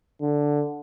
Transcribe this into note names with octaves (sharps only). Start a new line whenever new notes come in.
D3